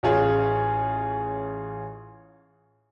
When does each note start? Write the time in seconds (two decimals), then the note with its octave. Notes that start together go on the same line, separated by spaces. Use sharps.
0.03 A1 C#4 F4 G#4 C#5